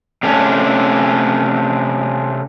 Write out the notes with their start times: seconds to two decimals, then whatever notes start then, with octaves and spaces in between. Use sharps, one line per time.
0.23 C3 A3 C#4 D4